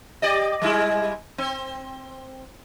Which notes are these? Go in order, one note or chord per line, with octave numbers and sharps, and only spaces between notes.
G4 D5 D#5
G3 G#3 E4
C4